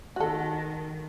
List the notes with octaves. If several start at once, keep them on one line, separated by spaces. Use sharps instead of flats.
D#3 F#4 A4